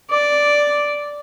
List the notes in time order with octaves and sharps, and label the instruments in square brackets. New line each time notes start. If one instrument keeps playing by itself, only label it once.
[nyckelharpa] D5